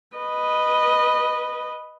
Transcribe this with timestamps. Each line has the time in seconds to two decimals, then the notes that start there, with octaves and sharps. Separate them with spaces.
0.17 B4 D#5